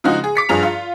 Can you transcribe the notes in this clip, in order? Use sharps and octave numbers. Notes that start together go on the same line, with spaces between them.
C#3 F3 G#3 D#4 F#4
G#4
D6 B6 C#7
G2 F3 G#4 A#5 F7
F4